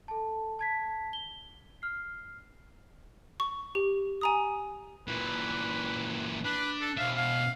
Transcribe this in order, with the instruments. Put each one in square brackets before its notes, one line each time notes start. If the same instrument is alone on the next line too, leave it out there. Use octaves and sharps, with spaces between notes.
[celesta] A4 A5
A5 G#6 B6
G7
F6 C7
[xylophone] C#6
G4
G#5 A#5 D#6
[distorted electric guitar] A#2 E3 [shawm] B4
[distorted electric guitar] D4 [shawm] B4
[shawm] A4
[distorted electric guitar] B2 E5 [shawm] F5
[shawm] F5